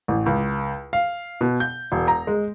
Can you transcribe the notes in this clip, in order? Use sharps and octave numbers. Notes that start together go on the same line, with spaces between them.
A1
C#2
F5
B2
G6
E1
A#5
G#3